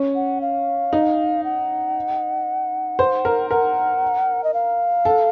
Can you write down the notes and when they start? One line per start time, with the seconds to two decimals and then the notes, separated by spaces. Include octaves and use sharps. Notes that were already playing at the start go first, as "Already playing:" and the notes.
Already playing: C#4
0.15 F#5
0.41 F5
0.93 D#4
1.44 F#5
2.99 C5
3.25 A#4
3.50 A#4 F#5
4.44 D#5
4.54 F5
5.05 A4